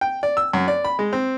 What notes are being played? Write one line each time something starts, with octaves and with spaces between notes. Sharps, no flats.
G5
D5
E6
F#2
D5
B5
G#3
C4